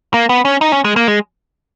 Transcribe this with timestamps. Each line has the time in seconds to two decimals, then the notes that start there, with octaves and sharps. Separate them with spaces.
0.14 A#3
0.29 B3
0.45 C#4
0.61 D#4
0.72 C#4
0.84 G#3
0.96 A#3
1.08 G#3